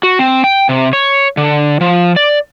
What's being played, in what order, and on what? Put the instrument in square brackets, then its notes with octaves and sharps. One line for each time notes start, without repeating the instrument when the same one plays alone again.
[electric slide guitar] F#4
C4
G5
C3
C#5
D3
F3
D5